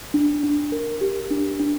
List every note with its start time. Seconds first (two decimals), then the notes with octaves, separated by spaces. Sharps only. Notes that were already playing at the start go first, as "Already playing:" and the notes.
0.14 D4
0.43 D4
0.72 A#4
1.01 G4
1.30 D4
1.60 D4